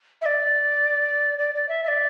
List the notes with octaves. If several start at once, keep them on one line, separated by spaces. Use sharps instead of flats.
E5
D5
D5
D5
E5
E5
D5